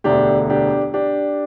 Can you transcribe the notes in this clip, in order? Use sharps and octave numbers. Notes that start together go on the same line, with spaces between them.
E1 D2 D3 D4 G4
D4 G4
D4 G4